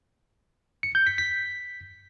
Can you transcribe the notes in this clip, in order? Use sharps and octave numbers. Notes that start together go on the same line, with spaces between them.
C#7
G6
B6
B6